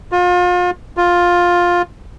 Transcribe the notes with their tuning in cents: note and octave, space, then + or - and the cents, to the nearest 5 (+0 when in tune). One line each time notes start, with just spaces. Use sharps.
F4 +35
F4 +10